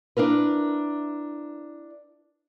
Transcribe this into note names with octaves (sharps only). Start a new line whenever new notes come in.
D4 E4 A#4 B4